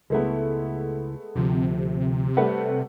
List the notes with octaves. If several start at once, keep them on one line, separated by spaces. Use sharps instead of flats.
C#2 G#3 A3 B3 E4
D2 C3 F3
G3 A3 B4 F#5